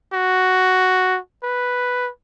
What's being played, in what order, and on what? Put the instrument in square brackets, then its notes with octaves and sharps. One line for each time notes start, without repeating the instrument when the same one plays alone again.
[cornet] F#4
B4